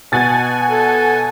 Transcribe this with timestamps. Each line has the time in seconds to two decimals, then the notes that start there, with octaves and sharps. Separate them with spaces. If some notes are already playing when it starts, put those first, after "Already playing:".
0.12 B2 F#5 G#5 A6
0.71 A4